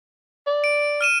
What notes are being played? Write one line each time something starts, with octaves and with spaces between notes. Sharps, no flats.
D5
D7
F6 D#7 E7